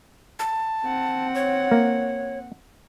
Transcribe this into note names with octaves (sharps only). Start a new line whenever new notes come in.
A5
C4 F#5
C#5
A#3